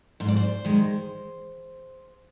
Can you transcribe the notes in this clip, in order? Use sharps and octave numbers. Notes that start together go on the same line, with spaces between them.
G#2 C5
D5
C5
D#3 G#3